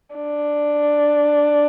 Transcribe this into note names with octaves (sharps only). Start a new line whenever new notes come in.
D4